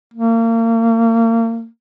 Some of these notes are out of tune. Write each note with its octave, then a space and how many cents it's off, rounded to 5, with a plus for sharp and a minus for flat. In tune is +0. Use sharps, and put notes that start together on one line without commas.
A#3 -35